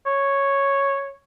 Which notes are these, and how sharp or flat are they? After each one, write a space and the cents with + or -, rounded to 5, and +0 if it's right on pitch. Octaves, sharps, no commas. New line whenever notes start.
C#5 -5